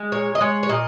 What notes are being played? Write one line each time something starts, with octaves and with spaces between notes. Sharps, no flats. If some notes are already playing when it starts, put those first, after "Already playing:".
Already playing: G#3
A#2 C#5
D#5
G#3 C#5
C#5
A#2 D#5